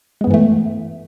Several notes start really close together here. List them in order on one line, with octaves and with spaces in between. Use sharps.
G#3 B3 G2 E3 A3